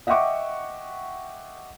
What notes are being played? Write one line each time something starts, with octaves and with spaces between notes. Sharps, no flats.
D#5 E5 F#5 G5 C#6 D6